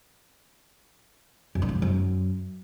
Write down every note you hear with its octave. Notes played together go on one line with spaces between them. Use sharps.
F#2
D3
F3
B2
F#2